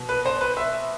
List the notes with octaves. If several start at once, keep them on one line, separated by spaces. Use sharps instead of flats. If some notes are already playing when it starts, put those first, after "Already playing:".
Already playing: B2
B4
C5
B4
E5